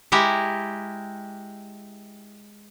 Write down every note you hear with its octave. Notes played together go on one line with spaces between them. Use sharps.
G#3 E4 G4 A#5